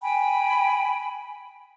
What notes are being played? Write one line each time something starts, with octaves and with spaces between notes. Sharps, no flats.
G5 G#5 B5